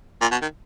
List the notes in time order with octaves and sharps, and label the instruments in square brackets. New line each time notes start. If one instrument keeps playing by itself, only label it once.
[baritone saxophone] A#2
B2
D#3